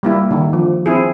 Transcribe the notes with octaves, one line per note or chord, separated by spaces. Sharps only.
G3 A#3 E4
D3 D#3
F3
C4 E4 G#4